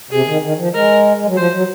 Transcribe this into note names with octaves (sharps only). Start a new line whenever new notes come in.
C3 G#4
D#3
D#3
F3
G#3 A#4
G#3
F#3
F3 C5
F#3